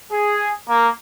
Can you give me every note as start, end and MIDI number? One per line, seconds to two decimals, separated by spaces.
0.11 0.51 68
0.68 0.88 58